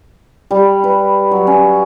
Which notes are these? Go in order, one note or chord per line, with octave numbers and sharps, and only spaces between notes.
G3
B4
F#3
C#4